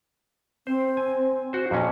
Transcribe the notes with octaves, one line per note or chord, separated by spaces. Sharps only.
C4 C5
G#5
F#4 C5
F2 A#2 C#4